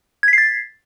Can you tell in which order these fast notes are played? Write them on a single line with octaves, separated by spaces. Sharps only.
G#6 B6 C7 A6